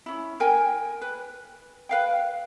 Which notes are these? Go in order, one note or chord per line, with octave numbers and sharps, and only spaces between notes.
C#4 E4
A#4 G5 G#5
B4
B4 F5 G5